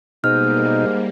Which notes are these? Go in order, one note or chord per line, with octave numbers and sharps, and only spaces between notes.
G#2 B2 G3 A#3 D#4 F6